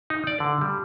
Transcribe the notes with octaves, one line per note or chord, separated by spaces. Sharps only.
D#4
D5
D3
G3